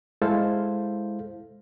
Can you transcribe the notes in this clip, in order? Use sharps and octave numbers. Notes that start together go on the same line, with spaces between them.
G#3 E4 A4 C5 F5